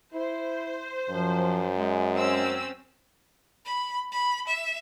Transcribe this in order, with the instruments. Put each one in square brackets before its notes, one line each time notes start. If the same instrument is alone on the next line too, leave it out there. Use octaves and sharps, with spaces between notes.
[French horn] E4 [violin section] C5
[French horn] F#2 [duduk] F3
[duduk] G#3
[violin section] C4 C#4 E6
[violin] B5
B5
E5